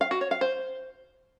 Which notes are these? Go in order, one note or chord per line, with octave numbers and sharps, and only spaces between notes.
F5
F#4
C#5
F5
C5